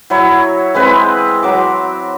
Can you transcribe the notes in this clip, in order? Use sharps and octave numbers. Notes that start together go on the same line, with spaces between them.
F#3 E4 C#5
E3 G#3 C4 B4
F#3 D6